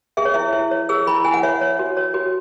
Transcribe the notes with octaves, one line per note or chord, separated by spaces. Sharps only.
G#4 E5
C#5
E4 E5
E4
C#5
G#4 E6
E4 B5
E4 G#5
F#5
C#5 E5
C#5
F#4
C#5
F#4